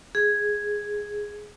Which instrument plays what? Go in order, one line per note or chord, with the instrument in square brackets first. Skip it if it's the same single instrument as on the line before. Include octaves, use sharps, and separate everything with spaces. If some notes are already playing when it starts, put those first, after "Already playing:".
[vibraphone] G#4